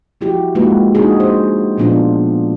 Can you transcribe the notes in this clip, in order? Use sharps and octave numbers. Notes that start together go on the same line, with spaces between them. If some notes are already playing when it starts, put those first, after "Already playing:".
F3 E4 F#4 G4
G#3 A#3 D#4 F4 F#4 B4
D4 D#4 F#4 G#4
C5
A#2 F3 B3 D4 F4